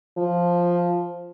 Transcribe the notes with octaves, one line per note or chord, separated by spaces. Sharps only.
F3